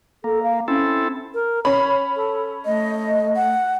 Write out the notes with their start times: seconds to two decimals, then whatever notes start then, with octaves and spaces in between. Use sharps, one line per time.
0.24 A#3 A4
0.43 F5
0.68 C4 C#4 E4 A4
1.34 A#4
1.65 C#4 C#5 B5
2.16 A4
2.66 A3 D#5
3.36 F#5